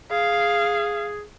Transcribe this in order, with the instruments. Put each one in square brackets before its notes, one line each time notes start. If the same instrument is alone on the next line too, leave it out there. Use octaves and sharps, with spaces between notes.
[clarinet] G#4 [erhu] F5